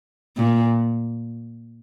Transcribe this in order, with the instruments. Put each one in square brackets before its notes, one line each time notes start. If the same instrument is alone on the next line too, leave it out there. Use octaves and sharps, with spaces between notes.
[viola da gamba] A#2